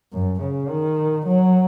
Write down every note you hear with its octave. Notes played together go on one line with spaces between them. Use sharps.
F#2
C#3
D#3
F#3